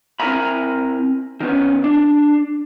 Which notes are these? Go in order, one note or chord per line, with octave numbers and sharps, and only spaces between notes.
C4 E4 A#4 G#5 A#5 B5
D#3 B3 C#4
D4